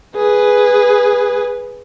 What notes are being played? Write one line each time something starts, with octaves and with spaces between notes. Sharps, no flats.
G#4 B4